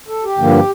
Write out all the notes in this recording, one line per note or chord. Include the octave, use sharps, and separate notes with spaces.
A4
G4
G2 D3 F3 A#3